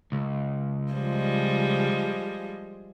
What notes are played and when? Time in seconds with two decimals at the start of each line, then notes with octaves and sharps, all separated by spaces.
0.12 C#2
0.92 F3 G3 G#3